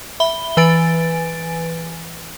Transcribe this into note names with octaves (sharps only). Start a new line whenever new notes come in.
E5 B5 G7
E3 B4 G#5 A6 D7